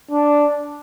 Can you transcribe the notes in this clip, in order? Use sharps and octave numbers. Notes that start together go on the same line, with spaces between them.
D4